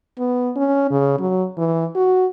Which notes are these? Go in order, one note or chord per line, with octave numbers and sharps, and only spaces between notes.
B3
C#4
C#3
F#3
E3
F#4